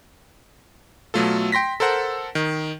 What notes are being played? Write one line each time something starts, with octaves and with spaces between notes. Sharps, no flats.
B2 F#3 A3 F4 A4
G5 C6 A#6 B6
A4 A#4 C5 F#5
D#3